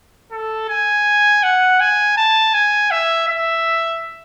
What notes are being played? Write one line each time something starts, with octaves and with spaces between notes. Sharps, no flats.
A4
G#5
F#5
G#5
A5
G#5
E5
E5